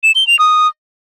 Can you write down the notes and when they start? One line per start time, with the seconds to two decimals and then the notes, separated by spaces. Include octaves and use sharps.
0.03 E7
0.15 G7
0.27 F7
0.39 D#6